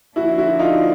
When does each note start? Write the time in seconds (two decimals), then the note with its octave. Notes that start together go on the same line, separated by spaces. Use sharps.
0.16 D3 F3 A#3 D4 E4 F#4
0.38 E4 F#4
0.59 D#4 F4